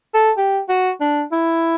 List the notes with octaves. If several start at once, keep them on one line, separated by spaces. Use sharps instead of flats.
A4
G4
F#4
D4
E4